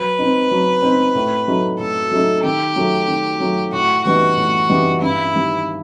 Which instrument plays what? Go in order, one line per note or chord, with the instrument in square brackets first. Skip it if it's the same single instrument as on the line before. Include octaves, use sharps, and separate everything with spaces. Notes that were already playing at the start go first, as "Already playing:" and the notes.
Already playing: [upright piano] F#3 [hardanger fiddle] B4
[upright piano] C4 D#4
F#3
C4 D#4
A2
F#3 A3 D#4
[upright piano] A2 [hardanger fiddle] A4
[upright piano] F#3 A3 D#4
[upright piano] D#3 [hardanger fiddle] G4
[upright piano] F#3 A3
D#3
F#3 A3
[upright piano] A2 [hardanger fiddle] F#4
[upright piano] E3 G3 B3 D#4 [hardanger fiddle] F#4
[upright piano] A2
E3 G3 B3 D#4
[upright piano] G2 [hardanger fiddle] E4
[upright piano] D#3 G3